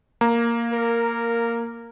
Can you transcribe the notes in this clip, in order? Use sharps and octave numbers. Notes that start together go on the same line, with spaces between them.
A#3 A#5
A#4